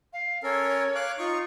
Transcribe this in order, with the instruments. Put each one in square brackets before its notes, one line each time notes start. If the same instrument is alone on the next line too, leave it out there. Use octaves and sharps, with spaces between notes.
[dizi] F5
[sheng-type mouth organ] C#4 A4 A#4 [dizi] C#5
[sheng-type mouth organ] F5 D6 F#6
[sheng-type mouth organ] D#4 C#6 [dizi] F4